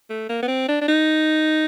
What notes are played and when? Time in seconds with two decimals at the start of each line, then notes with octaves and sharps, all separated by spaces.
0.10 A3
0.29 A#3
0.42 B3
0.48 C4
0.68 D4
0.81 D4
0.88 D#4